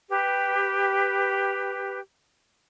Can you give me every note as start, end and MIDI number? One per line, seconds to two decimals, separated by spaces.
0.10 1.99 67
0.10 1.99 71